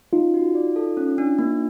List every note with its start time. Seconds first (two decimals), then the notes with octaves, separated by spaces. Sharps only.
0.13 C#4 D#4 F4
0.34 F#4
0.55 D5
0.76 A4
0.97 C#4
1.18 D4
1.39 A#3